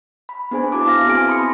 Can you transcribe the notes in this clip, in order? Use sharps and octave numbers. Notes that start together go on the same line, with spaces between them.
B5
B3 D4 G#4 C5 G#5
E4 F#4 A5 D6
F5 F6 A#6
B3 C4 E4 G#4 G#5 D7
A5 B5 C6 D#6 C#7